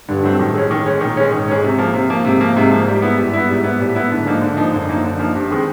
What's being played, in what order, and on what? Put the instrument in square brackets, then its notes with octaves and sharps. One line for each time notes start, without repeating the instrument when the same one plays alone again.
[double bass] G2 [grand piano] D3
[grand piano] F#3 A3 C4
[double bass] A2 [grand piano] D#3
[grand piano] G#3 C#4
D#3
G#3 C#4
[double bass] A#2 [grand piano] D#3
[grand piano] G#3 C#4
[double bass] G#2 [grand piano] D#3
[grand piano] G#3 C#4
C3
F3 A#3
C3
F3 A#3
[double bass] G#2 [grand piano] C3
[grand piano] F3 A#3
[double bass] G#2 [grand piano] C3
[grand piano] F3 A#3
G3
B3 E4
[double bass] G2 [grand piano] G3
[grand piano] B3 E4
[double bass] G#2 [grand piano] G3
[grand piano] B3 E4
[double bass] A2 [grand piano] G3
[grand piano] B3 E4
[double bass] G#2 [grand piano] D3
[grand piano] F3 A#3 D#4
D3
F3 A#3 D#4
[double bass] F#2 [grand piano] D3
[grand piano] F3 A#3 D#4
D3
F3 A#3 D#4
G2
D#3 G#3 C4